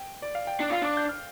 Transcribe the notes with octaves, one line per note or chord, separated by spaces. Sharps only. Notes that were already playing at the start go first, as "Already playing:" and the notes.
Already playing: G5
D5
F5
G5
D4 D5
F4 F5
D4 D6
G6
F6